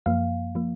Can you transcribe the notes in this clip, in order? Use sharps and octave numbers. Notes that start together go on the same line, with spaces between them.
F#2 F3 A#3 F5
F3 A#3